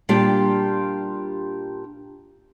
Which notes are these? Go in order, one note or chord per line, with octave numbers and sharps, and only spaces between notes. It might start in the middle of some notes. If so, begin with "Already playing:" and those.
A#2 G3 D4 F4 G4 G5